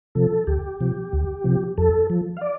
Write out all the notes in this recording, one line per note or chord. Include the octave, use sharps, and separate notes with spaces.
C3 F3 A4
D2 G4
C3 F3
D2
C3 F3
F2 A4
F3
F5
D5